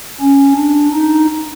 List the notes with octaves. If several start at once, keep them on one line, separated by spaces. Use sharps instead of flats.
C#4
D4
D#4